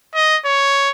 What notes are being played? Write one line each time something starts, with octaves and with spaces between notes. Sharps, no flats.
D#5
C#5